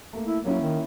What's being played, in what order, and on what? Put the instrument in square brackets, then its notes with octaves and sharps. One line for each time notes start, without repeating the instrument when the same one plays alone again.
[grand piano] A3 A#3
[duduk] E4
[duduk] F#3 [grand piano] A#3 C#4 E4
[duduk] D#3